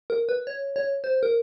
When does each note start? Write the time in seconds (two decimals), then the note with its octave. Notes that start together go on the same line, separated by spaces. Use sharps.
0.10 A#4
0.29 B4
0.47 C#5
0.76 C#5
1.04 C5
1.23 A#4